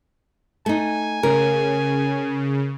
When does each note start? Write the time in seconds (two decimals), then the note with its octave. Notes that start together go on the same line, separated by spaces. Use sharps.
0.66 A3 D#4 G#5
1.23 C#3 A#4